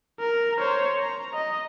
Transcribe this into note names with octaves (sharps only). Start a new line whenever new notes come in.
A#4
C5 C#5
A#5
D#5